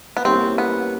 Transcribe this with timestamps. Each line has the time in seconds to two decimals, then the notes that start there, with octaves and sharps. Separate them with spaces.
0.17 B3
0.25 G3 A#3 C4 C#4 E4
0.58 B3